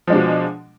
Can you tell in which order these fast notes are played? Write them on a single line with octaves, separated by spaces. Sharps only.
F3 G#3 D4 B2